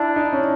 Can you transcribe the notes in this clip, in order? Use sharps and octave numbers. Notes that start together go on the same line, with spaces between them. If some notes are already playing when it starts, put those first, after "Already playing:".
Already playing: D4 E4
D#4
C#4